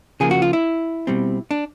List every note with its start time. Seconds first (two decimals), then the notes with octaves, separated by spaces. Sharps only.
0.20 C#3 F3 A#3 G#4
0.31 F#4
0.42 F4
0.53 E4
1.07 B2 G3 C4
1.51 D4